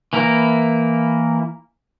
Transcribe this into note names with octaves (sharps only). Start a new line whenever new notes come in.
E3 A#3 E4 A#4